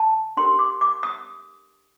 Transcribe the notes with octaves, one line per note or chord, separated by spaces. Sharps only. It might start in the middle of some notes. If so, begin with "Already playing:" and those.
Already playing: A5
D4 G4 A#4 C6
D6
D6
D#6